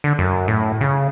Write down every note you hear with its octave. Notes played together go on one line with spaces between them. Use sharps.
D3
F#2
A2
C#3